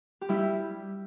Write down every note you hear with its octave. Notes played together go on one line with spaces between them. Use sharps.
G4
G3 E4